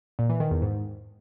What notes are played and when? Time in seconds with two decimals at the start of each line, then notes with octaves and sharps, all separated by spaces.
0.19 A#2
0.30 E3
0.40 D#3
0.51 E2
0.62 G#2